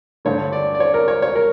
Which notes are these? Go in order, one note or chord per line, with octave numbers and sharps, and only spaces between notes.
G2 D3 A3 C#5
D5
D5
C#5
A#4
C#5
C#5
A#4